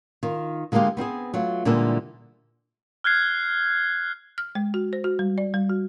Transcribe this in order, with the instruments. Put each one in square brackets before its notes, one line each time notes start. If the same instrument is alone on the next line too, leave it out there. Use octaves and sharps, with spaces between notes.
[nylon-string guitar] D#3 F4
D3 G#3 A#3 B3 F4 G4
B3 C4 E4 G#4
F#3 A3 F4
A#2 D3 E3 G3 G#3 A4
[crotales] F6 F#6 G#6 C7
[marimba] F6
G#3
F#4
C5
F#4
G3
D5
G3
F#4